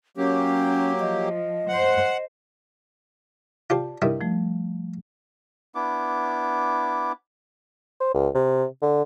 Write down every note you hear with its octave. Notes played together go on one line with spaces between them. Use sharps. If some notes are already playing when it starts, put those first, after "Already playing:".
F#3 A#3 C#4 G4
F3 D#5
C5 F#5
F4 G4 C5 D5 A5
G2 D#3 E4
F3 G3 A3
B3 D4 E4 D6
C5
C#2
C3
D3